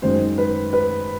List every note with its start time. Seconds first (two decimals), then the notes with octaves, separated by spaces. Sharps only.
0.02 F#2 D#3 G#3 C5
0.38 B4
0.73 B4